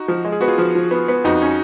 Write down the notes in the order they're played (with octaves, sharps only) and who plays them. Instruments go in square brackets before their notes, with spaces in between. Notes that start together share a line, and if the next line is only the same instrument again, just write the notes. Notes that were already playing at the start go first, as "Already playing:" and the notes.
Already playing: [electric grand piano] D#4 F#4
[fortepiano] F3
G#3
[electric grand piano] G#4
[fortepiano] B3 [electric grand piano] F#4
[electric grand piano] F4 G#4
[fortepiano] F3
F3
B3
B3
[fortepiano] F2 [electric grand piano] D#4 F#4
[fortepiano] C#4